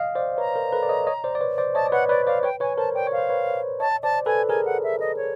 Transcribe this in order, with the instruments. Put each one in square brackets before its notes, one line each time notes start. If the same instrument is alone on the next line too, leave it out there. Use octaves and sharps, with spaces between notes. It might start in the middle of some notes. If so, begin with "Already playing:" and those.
Already playing: [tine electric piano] D#5 F5
C5 D5
[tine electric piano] B4 C#5 [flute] A#5
[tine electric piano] A#4 C5
A4 B4
D5
C#5 D#5
C#5 D#5
C5 D5
D5
B4 C#5
C5 D5
[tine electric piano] C#5 D#5 [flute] A5
[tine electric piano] D5
[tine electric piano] B4 C#5 [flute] F#5
[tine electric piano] B4 C#5 [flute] D5
[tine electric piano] C5 D5 [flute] F5
[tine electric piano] B4 C#5 [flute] G5
[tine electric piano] B4 C#5 [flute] G#5
[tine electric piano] A#4 C5 [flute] A5
[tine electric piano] D5 [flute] G5
[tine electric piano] C#5
[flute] F5
[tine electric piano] C5
B4 C#5
[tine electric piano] C#5 D#5 [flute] A5
[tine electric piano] C5 D5 [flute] A5
[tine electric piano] A4 B4 [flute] G#5
[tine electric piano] G#4 A#4 [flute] G#5
[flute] F#5
E5
D#5
C#5